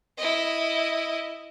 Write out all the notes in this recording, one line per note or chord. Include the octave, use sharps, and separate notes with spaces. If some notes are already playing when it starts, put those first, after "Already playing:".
E4 D#5